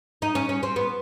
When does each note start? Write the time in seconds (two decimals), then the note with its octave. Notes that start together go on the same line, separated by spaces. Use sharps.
0.22 D#4
0.35 C#4
0.49 C#4
0.63 C4
0.76 B3